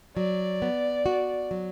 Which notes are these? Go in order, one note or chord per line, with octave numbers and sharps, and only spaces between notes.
F#3 D5
B3
F#4
F#3